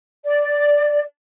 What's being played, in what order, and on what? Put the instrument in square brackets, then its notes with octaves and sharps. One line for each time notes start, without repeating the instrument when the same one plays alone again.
[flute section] D5